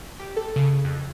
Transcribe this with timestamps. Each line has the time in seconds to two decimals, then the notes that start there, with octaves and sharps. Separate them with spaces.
0.20 G4
0.37 A4
0.56 C#3
0.84 F2